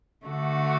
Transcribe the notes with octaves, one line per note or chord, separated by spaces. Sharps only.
D3 A3 F#4